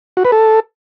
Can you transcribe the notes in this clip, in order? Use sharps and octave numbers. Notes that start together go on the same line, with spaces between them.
F#4
B4
A4